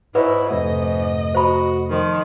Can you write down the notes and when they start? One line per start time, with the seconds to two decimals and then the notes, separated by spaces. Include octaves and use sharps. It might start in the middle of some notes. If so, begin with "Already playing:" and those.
0.15 G#2 E4 B4 C#5 D#5 F#5
0.51 F2 C3 A3 D#5
1.35 F#4 C5 B5
1.90 D#3 F3